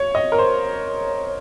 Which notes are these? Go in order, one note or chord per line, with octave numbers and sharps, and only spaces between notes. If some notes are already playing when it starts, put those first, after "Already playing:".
Already playing: C#5
D#5
A#4
C5